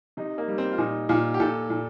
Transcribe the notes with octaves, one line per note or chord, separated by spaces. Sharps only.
C3 D#4
A#3
G3
C4
F4
A#2 D#4
A#2 F4
G4
A#2 A4
A#2